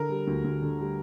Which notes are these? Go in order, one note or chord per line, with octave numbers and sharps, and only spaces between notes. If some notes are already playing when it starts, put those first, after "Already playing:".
Already playing: D3 A#4
G3
D2
D2
D3
G3